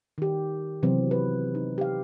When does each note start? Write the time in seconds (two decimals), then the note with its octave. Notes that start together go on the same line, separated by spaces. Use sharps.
0.18 D#3 G4
0.83 C3 E3 F#3 B3 C4
1.11 B4
1.55 D#4
1.78 G4 F5